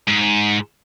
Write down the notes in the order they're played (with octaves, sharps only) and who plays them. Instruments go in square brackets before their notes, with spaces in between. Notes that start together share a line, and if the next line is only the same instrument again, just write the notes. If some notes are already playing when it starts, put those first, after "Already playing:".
[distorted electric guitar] G#2